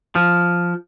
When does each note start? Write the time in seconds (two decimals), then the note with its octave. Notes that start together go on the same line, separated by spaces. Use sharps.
0.15 F3